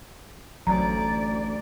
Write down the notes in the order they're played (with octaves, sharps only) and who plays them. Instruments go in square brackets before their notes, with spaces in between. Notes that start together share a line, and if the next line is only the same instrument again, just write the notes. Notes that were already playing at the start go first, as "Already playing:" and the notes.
[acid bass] A1 [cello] D2 D5 [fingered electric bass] F#3 [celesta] A#5